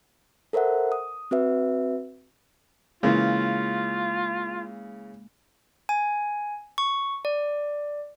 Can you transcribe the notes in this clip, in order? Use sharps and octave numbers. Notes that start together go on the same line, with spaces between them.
A4 A#4 C5 E5 F#5
D#6
C4 F#4 B4 E5
C#3 E3 G#3 A#3 F4
G#5
C#6
D5